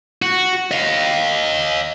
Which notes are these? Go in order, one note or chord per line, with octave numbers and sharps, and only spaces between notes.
F#4
D#5 F5